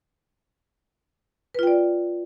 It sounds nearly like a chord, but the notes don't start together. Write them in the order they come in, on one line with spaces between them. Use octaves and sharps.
B4 F4 G5 D5